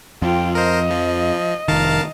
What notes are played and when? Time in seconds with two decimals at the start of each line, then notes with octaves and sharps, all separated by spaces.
0.22 F2 F4 G5
0.55 A#4 C5 D#5
0.91 F3
1.68 F1 D#3 A#4 F5 A5